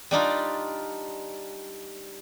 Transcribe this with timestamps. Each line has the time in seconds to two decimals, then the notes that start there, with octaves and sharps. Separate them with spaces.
0.11 G3 D4 D#4 F4